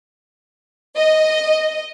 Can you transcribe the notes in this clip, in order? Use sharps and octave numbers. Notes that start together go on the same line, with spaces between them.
D#5